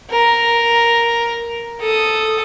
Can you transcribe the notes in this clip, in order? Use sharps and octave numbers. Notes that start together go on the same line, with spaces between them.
A#4
A4 D#6